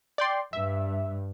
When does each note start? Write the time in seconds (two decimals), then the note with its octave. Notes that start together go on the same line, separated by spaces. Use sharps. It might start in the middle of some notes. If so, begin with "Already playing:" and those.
0.18 D5 G5 C6
0.53 G2 E5